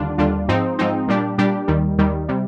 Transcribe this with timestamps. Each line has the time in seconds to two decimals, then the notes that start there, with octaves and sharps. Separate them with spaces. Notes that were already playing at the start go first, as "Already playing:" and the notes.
Already playing: D#2 D3 G3 D4 F4
0.18 D#2 D3 G3 D4 F4
0.48 G#2 F3 C4 D#4
0.79 G#2 F3 C4 D#4
1.08 A#2 G3 D4 G4
1.38 A#2 G3 D4 G4
1.68 D#2 D#3 G3
1.98 D#2 D#3 G3
2.28 C3 G3